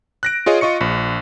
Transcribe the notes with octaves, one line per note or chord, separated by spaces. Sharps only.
F#6 A#6 D7
F4 G#4 C#5 D#5
F4 D#5 C#6 C#7
A#1